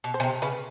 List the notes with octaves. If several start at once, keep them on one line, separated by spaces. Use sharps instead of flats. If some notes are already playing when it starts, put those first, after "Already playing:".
B2
C5
C#3
C3
C#3 B4